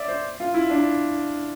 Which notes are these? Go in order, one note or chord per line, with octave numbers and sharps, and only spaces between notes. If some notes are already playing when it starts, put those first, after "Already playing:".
Already playing: D5 E5
C5
F4
E4
D4